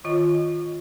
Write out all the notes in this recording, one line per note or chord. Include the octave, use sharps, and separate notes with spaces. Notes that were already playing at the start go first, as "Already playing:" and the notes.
D#3 F4 D#5